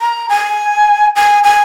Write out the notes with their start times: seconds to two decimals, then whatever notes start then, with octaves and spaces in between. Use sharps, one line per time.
0.01 A#5
0.29 G#5
1.16 G#5
1.44 G#5